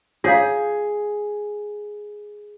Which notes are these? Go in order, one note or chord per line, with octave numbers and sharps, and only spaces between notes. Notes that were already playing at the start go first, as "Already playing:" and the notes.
F4 G#4 C#5 F5